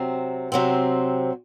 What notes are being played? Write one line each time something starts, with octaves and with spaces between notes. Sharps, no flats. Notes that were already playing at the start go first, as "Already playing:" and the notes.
Already playing: C3 F#3 C4
C3 F#3 C4